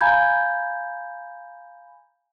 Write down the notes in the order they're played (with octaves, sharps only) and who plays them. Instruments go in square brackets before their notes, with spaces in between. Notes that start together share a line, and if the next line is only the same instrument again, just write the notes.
[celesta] F5 G#5 A#5 B5 G6 G#6